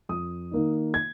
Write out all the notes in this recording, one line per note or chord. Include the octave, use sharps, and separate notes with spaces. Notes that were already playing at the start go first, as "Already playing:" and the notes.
F2 D#6
D#3 A#3 D#4
G#6